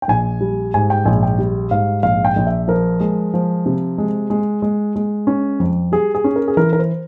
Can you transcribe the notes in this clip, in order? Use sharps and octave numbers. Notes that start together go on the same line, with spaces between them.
G5
A#1 G#5
G3
G#2 G#5
G5
A#1 G#5
G5
G3
G#2 F5
A#1 F5
G5
A#1
E5
F3 A#4
G#3
F3
C3
G#3
G#3
G#3
G#3
C#4
F2
G3 G#4
G#4
C#4
A#4
G#4
E3 A#4
A#4
C5